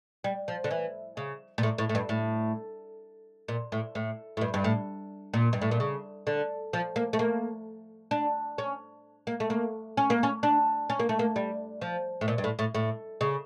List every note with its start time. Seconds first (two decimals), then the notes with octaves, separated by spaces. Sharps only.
0.24 G3
0.48 F3
0.64 D3
0.71 E3
1.17 C#3
1.58 A#2
1.63 A2
1.78 A2
1.89 A2
1.95 G2
2.09 A2
3.48 A#2
3.72 A2
3.95 A2
4.37 A2
4.41 G2
4.54 G2
4.64 A2
5.34 A#2
5.53 G2
5.62 A2
5.71 A#2
5.80 C#3
6.27 D3
6.73 F3
6.96 A#3
7.13 A3
7.19 A#3
8.11 D4
8.58 C#4
9.27 A#3
9.40 A3
9.50 A#3
9.97 C#4
10.10 A#3
10.23 C#4
10.43 D4
10.90 C#4
11.00 A#3
11.09 A3
11.19 A#3
11.36 G3
11.81 F3
12.21 A2
12.28 A#2
12.38 G2
12.44 A2
12.59 A2
12.75 A2
13.21 C#3